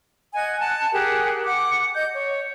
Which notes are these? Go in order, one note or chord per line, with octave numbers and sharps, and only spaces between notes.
D#5 F#5 G#5 G#6
F#5 A5
G4 G#4 A#4 F#5
F#5 D6
D#5 G6
C#5